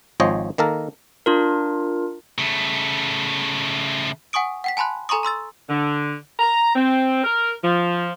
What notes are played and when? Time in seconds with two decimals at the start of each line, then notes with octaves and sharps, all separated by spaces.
0.20 G#1 F3 C5 C#5 D#5
0.58 D#3 A#3 A4 A#4
1.26 D4 F4 A#4
2.38 C#3 A3
4.33 F#5 G#5 C#6 D#6 D7
4.64 F#5 G5 B6
4.77 G#5 A5 B5 C6 F#6
5.09 A4 G#5 A#5 C6 C#6 D#6
5.23 A#5 C6 E6 A6
5.68 D3
6.39 A#5
6.75 C4
7.23 A#4
7.63 F3